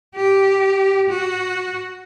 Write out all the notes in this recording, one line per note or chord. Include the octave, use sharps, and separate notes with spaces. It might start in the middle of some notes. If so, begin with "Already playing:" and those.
G4
F#4